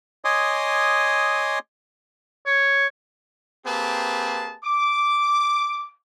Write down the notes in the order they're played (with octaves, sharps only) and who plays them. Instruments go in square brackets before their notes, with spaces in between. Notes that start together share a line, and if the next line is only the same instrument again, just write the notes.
[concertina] C#5 D#5 G#5 C6 D6 D#6
[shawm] C#5
[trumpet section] A#3 C4 G4 G#4 B4 A5
D6